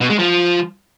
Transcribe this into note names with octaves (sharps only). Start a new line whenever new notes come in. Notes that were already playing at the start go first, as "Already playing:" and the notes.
B2
G#3
F3